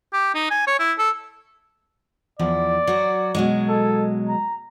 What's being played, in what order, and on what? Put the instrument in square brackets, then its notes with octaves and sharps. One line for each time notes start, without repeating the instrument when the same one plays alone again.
[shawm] G4
D#4
G#5
C#5
E4
A4
[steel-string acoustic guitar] E2 F3 E4 [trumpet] D5
[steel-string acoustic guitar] F#3 F#4
B2 F#3 G#3
[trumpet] A4
A#5